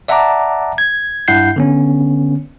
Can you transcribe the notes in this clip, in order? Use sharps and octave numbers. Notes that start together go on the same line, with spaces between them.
D5 E5 F#5 A5 A#5 D6
G#6
G2 E4 F#5 G6 C7
D3 B3 C#4